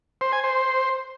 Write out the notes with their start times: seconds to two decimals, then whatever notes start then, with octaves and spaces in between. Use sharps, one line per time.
0.21 C5
0.32 G#5
0.44 C5